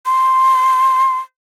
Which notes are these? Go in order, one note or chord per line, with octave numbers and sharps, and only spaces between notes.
C6